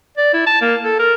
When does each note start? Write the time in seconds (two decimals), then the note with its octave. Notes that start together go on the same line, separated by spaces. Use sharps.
0.17 D5
0.33 E4
0.47 A5
0.62 A#3
0.83 A4
0.99 A#4